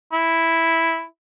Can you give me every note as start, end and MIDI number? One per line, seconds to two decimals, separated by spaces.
0.12 1.04 64